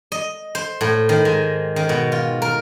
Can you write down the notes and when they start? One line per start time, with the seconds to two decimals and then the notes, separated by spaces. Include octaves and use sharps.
0.12 D#5
0.55 C5
0.81 A2
1.09 D#3
1.25 G#2
1.76 D#3
1.89 B2
2.12 F4
2.42 A#4